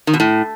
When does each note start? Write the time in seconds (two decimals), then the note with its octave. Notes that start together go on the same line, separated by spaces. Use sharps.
0.07 D#3
0.14 B2
0.20 A2